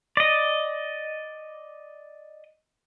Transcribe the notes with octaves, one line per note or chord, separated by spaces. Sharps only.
D5 D#5